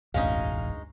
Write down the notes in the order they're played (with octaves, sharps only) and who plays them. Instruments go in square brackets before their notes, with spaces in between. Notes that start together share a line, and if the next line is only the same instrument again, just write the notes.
[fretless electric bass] E1 A1 [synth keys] D2 G2 [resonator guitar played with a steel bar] G#3 C#4 D#4 [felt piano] F5